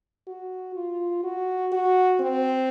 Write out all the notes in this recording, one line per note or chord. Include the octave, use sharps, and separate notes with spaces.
F#4
F4
F#4
F#4
C4